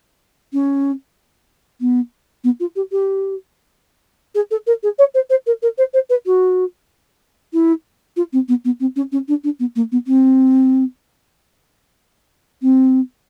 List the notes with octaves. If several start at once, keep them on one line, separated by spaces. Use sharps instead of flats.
C#4
B3
B3
F4
G4
G4
G#4
A4
A#4
G#4
C#5
C5
C5
A#4
A#4
C5
C5
B4
F#4
E4
F4
C4
B3
B3
C4
C#4
C#4
D4
D4
B3
A#3
B3
C4
C4